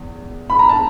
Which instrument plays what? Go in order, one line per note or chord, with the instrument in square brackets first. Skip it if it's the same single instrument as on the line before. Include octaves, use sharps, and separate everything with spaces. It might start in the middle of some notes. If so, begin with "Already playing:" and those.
Already playing: [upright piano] E2
B5
A#5
A5